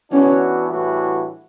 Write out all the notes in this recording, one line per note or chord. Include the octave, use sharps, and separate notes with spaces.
E3 B3 C#4 D4 F#4
A2 E3 G3 D4 F#4